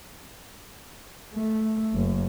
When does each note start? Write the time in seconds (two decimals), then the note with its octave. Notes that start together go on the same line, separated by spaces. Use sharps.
1.35 A3
1.93 F#1